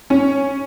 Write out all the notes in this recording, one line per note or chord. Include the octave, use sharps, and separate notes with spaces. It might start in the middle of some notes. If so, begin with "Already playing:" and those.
C#4